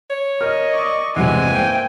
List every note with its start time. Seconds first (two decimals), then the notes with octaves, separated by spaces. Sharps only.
0.10 C#5
0.41 A#4 D#5 F6
0.72 D5 C#6
1.16 E2 G2 C3 E3 G#3 C4 G#5
1.51 A#3 C5 G5